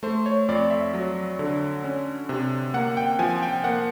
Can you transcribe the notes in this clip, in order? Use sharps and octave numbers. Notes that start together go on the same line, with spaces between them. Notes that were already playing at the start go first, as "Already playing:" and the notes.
A3 C5
C#5
F2 D5
E5
F#3
D3
C#4
C3
A#3 F#5
G5
F3 G#5
G5
A#3 F#5